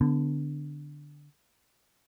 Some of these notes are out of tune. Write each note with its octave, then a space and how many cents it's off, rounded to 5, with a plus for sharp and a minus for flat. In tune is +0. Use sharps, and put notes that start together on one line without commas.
D3 +0 B3 +25